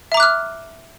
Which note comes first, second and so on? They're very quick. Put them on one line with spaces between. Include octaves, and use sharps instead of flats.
E5 A#5 D6 F#6 F6